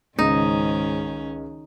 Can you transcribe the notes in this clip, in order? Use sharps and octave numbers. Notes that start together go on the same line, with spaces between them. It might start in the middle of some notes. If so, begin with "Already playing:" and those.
C#2 G#2 D#3 C#4 D#4